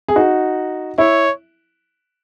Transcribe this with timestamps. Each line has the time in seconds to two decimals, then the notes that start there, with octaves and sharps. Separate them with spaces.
0.08 G#4
0.16 D#4 F#4
0.98 E4 C#5